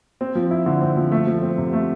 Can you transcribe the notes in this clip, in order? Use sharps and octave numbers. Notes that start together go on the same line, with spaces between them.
C4
F3
E4
D3
C4
F3
A3
F3
C4
C3
A3